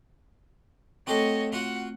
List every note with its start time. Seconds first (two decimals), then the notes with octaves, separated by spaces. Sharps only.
1.07 A3 C4 F#4 G4 A4 C#5 D#5
1.52 F4 F#4 F#5